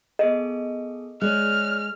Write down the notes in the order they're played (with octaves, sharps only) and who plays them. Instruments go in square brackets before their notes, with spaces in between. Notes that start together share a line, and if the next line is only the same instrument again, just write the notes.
[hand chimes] B3 G#4 A4 [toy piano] D#5
[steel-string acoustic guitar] G#3 [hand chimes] C#5 D5 F#6 [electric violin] F6